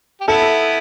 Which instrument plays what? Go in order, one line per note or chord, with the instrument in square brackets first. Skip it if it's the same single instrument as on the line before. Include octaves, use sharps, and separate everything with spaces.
[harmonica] G4
[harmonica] B3 E4 [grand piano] A4